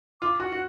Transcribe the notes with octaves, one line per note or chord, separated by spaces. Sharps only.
F4 D6
F#4 F#5
F#4